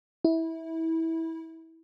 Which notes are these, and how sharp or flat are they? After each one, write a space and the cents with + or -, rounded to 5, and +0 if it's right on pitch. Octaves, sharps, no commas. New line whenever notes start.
E4 -20